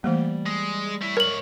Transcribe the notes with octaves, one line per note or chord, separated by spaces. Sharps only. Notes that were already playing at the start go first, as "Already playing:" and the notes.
E3 G3 A3 A#3
G#3
A3 E4
G#2 A#4 C#5 F#7